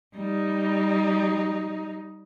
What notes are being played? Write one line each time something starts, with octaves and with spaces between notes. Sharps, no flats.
G3 D#4